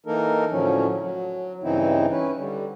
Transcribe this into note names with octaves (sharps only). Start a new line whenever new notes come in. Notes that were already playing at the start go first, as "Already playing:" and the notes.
E3 A#3 D#4 A4 A#4
A2 D3 F3 F#3 C#4
F#3
G2 C#3 E3 C4 D#4 E4
C#4 B4
D3 G3